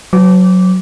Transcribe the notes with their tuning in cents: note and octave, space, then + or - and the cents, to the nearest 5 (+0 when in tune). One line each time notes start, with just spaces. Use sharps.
F#3 +0 B4 +45 D6 -15